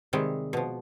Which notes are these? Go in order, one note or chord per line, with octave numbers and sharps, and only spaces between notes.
C3 D#3 G3 G#3
B2 F3